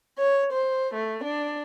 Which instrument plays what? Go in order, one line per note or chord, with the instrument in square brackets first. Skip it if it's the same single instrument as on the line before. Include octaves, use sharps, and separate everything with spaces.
[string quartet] C#5
C5
A3
D4